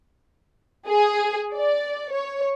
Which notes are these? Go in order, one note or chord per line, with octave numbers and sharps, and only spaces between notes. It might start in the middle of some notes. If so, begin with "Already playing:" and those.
G#4
D5
C#5